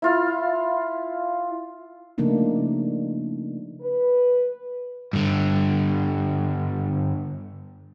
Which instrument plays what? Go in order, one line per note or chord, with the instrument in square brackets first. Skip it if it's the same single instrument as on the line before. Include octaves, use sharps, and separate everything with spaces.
[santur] E4 F4 F5
[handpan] C#3 F3 A3 A#3 D4 D#4
[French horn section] B4
[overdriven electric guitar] G2 D3